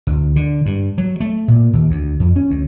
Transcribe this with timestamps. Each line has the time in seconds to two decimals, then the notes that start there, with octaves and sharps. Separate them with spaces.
0.07 D2
0.36 D3
0.66 G2
0.98 F#3
1.20 A3
1.48 A#2
1.73 D#2
1.90 D2
2.20 F2
2.36 C#4
2.50 D2